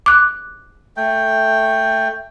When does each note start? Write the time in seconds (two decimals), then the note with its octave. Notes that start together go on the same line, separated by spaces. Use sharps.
0.06 D6 F#6
0.97 A3 G5